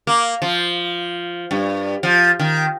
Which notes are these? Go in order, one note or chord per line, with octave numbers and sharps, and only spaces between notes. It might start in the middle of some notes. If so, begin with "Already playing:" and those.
A#3
F3
G2
F3
D#3